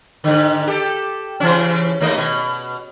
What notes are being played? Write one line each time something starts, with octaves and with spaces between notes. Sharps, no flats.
G#2 D3
G4 A4
C#3 E3 C#4
D#2 A3 D#5
B2